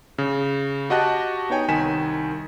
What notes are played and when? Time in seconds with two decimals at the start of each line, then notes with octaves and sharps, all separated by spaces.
0.18 C#3
0.90 F#4 G4 D#5 F#5 A5 F#6
1.50 B3 D#4 C#5 G5 G#5
1.68 C2 D#3 G#5 B6 E7